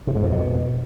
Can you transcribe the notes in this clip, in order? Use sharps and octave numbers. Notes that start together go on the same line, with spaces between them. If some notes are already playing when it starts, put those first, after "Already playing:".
C3
G#2
F2
B2